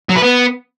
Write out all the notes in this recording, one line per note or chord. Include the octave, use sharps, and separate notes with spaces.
F#3
B4
B3